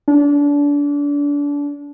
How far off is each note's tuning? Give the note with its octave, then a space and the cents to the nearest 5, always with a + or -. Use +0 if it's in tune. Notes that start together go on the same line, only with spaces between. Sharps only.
D4 -30